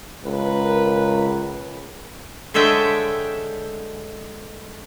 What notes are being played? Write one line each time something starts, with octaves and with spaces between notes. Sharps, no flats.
C#2 A#4 B4
D3 G#3 A4 C#5 E5 G5